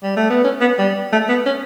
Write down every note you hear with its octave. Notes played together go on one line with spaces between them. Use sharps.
G3
A3
B3
C#4
B3
G3
A3
B3
C#4